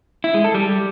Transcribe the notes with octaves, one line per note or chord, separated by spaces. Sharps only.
E4
G#3
A4
G3